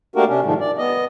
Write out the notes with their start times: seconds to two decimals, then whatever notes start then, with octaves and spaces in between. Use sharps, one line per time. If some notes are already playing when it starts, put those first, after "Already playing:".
0.16 A3 A#3 D4 F#4 G4 A#4
0.28 C3 C#4 D4
0.44 G#2 C3 D#3 F3 G3 A3
0.60 D5
0.78 B3 D#5